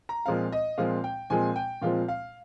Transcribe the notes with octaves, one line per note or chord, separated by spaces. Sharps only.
A#5
A#2 F3 G#3 C4 F5
D#5
A#2 F3 G#3 C4 F5
G5
A#2 F3 G#3 C4 G#5
G5
A#2 F3 G#3 C4 F5
F5